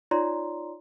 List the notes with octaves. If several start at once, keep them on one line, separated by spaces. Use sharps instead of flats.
D#4 F4 C#5 D5 A#5 C6